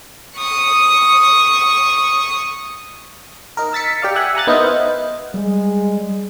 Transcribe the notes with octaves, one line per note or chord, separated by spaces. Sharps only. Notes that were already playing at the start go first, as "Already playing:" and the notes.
C#6 D#6
D#4 A#4
E6 A6 B6 C#7
G4 D5 F5
E5 F#5 G#5
G#5 A#5 F#6 A6
B3 D#4 E4 A#4 C5 D#5
G3 G#3